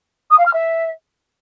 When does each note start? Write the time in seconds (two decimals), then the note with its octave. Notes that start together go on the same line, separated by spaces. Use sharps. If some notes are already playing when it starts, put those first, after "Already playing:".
0.30 D#6
0.38 F5
0.46 F6
0.53 E5